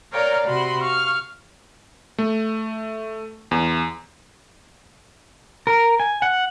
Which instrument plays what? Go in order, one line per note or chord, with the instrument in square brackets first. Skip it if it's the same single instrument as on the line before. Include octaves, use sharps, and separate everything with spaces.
[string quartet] A#4 C#5 D5 F5 G5 A#5
C3 F#4 B5 C6
F5 C#6 F6
[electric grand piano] A3
E2
[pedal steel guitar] A#4
G#5
F#5